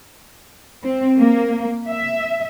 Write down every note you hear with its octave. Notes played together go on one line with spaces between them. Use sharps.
C4
A#3
E5